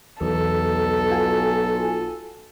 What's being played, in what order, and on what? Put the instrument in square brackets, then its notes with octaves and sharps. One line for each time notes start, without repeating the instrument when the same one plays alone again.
[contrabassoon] B1 [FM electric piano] E2 [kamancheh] A4
[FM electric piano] F4 F#4 G#5